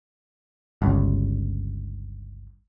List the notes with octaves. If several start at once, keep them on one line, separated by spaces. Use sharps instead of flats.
G1 C#2